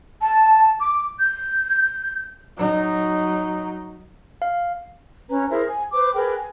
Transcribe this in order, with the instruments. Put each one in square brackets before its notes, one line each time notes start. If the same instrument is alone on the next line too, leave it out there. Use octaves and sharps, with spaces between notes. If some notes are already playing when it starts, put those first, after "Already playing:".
[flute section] A5
D6
G6
[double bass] F#3 D#4
[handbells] F5
[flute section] C#4 B4 A#5
E4 G#4 A#4 C5
G#5
B4 C5 D6
G#4 A#4 B4 G5
G#5